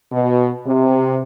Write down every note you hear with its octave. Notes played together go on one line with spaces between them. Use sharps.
B2
C3